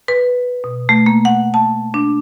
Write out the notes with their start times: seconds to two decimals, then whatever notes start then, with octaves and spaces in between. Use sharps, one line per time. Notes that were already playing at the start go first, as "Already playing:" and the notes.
0.08 B4
0.64 B2
0.89 A3
1.06 A#3
1.25 F#5
1.54 A5
1.94 D4